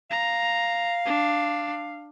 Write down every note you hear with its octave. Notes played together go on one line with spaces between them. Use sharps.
F5 A#5
D4